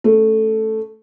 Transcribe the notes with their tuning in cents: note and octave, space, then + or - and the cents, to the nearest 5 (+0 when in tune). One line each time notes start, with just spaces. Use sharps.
A3 +0 C#4 +0